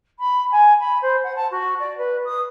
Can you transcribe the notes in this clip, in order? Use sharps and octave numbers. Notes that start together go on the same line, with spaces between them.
B5
G#5
B5
C5
F#5
A5
F#4
D5
B4
D#6